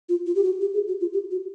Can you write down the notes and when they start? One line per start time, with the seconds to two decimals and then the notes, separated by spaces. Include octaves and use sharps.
0.09 F4
0.26 F4
0.35 G4
0.43 F#4
0.61 G4
0.74 G#4
0.88 F#4
1.00 F4
1.13 G4
1.31 F#4